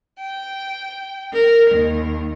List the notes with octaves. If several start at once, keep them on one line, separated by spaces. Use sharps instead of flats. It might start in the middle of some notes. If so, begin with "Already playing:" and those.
G5
A#4
D#2